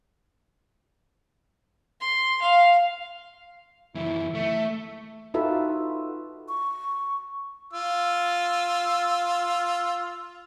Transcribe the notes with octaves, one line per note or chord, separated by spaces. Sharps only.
C6
F5
F#2 E3 E4
A3 E5
D#4 F4 F#4 A4 B4 E5
C#6
F4 E6